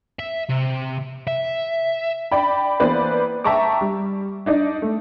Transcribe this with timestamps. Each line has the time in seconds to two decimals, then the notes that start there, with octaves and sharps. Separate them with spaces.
0.19 E5
0.50 C3
1.27 E5
2.31 D5 G5 B5
2.80 E3 A#3 B3 B4 C5 D5
3.44 E5 G5 A5 A#5 C#6 D6
3.81 G3
4.46 D4 D#4 D5
4.82 A3